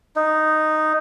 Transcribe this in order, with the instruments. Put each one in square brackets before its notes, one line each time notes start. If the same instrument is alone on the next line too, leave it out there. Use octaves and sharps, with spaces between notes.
[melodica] D#4